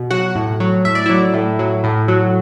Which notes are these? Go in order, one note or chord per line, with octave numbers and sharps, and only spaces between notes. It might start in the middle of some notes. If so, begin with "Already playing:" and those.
Already playing: B2
F#3 F#4 F#5
A2
F#3
A2 E5
D5
F#3 E4 E5
A2
F#3
A2
F#3